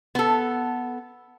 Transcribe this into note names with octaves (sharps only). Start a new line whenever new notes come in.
B3 A4